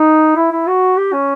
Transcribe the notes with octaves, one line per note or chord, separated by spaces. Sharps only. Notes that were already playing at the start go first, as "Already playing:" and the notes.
Already playing: D#4
E4
E4
F#4
G4
C#4